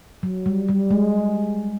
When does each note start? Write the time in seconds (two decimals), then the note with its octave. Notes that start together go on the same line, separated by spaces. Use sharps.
0.23 F#3
0.46 G3
0.69 G3
0.91 G#3